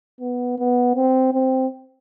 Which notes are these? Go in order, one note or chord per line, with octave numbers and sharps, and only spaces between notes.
B3
B3
C4
C4